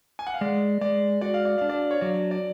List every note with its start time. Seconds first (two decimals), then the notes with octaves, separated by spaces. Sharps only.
0.19 G#5
0.27 F#5
0.34 F5
0.41 G#3 D5
0.81 G#3 D5
1.21 F#4 D5
1.34 F5
1.45 D5
1.58 D4 F5
1.69 D5
1.91 C#5
2.01 F#3 D5
2.31 D5